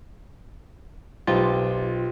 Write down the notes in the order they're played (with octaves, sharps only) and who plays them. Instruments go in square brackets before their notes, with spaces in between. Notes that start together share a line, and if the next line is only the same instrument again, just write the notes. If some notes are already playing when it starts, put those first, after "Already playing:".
[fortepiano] B1 [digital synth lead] F4 [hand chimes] G4 C5 G5